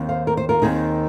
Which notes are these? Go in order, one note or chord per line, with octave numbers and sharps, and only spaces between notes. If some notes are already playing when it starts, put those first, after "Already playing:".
Already playing: D#2 D#3 C4
C5 F5
A#4
C5
F4 A#4
D#2 D#3 C4 D#4 G#4